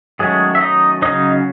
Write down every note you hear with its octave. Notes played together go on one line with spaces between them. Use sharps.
D#3 F#3 G#3 A3 C#4 G#4
E5
D#4 D#5
C#3 F#3 C#4 D#4 D#5